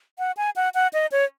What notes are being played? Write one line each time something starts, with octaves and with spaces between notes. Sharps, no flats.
F#5
G#5
F#5
F#5
D#5
C#5